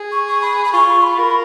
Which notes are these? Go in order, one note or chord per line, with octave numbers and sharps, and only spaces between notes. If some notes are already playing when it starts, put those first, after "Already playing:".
Already playing: G#4
C#6
C#6
B5
B5
F4 C#6
B5
A#4